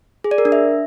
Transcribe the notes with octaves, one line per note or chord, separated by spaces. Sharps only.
G#4
D5
A#4
D4
E5